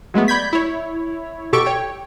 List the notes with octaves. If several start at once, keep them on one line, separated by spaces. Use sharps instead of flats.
F#3 G#3 A3 B3
D5 B5 G6 G#6 B6
E4 C#5
B2 G4 A4 C#6 D7
C#5 G5